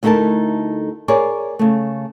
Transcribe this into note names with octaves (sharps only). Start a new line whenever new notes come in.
D2 A3 D#4 E4 A#4 A5
G#4 A#4 C#5 D5
C#3 A3